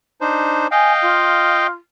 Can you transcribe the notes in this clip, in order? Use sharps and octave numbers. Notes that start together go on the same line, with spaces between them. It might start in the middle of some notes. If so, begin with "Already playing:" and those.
D4 D#4 C5
D#5 F5 G5 G#5
F4